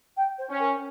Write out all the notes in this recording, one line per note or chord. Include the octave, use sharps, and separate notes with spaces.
G5
C5
C#4
A#4